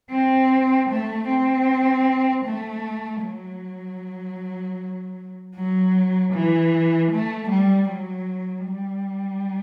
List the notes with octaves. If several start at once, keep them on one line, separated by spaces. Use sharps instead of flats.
C4
A3
C4
A3
F#3
F#3
E3
A3
G3
F#3
G3